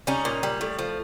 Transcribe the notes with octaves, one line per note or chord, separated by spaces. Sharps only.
G3 C#4 D#4
A#2
G3
A2
F3